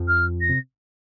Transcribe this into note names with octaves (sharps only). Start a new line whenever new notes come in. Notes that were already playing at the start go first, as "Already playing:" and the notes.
Already playing: F2 F3
F6
A#6
C3